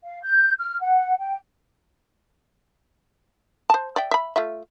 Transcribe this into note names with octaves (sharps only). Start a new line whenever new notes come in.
F5
G6
F6
F#5
G5
C5 A5
D5 E5 G5
E5 B5
A3 F4 E5